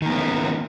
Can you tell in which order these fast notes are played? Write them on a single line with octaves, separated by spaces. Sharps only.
D#3 A#3 B3 C#4